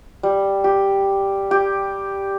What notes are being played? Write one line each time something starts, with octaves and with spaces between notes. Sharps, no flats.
G3
G4
G4